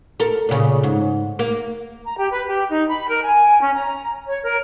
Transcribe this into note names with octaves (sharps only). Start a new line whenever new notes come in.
A4 A#4
A#2 C#3
G#2
A#3
A#5
G4
B4
G4
D#4
B5
A#4
G#5
C#4
A#5
C#5
A#4